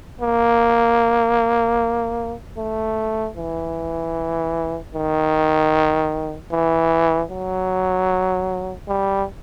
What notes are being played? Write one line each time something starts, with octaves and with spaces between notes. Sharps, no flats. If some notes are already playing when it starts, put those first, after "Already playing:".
A#3
A3
E3
D#3
E3
F#3
G3